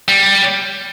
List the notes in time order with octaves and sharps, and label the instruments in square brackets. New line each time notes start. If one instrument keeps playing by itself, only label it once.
[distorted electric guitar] G3